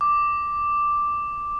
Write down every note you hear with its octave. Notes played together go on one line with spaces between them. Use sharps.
D6